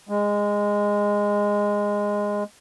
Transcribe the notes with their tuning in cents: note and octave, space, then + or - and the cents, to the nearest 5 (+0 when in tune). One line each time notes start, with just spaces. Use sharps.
G#3 -15